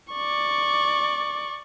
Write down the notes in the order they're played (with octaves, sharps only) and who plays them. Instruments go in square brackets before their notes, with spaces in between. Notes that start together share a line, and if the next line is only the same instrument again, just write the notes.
[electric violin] D5 C#6